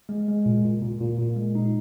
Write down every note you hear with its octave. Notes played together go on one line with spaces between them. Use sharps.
G#3
G#3
A#2
A#2
A#2
A#2
A#2
G#3
D#4